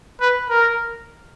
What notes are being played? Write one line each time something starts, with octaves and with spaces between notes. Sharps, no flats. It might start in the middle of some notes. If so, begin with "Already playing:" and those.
B4
A#4